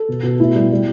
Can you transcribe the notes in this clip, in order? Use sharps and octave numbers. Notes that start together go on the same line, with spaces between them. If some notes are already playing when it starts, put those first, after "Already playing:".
Already playing: A4
B2
B2
A2 E4
G3
G3